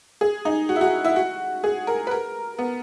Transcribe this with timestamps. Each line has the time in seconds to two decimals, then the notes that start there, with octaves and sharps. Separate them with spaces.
0.21 G#4
0.45 D#4
0.69 F#4
0.76 E4
0.81 F#4
1.04 E4
1.16 F#4
1.64 G#4
1.87 A#4
2.07 B4
2.11 A#4
2.58 B3